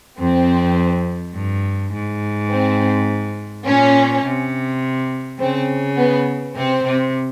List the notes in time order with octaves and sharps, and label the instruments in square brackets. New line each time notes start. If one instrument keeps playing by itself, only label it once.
[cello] F2 [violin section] C4
[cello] G2
G#2
[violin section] C4
[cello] A#2 [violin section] C#4
[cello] C3
[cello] C#3 [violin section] C4
[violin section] B3
[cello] C3 [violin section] C4
[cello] C3